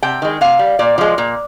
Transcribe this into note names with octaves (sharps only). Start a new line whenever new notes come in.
C3 G5
D#3 G#3
C3 F5
G3
A#2 D5
F3 G#3
A#2